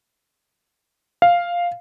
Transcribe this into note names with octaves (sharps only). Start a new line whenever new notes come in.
F5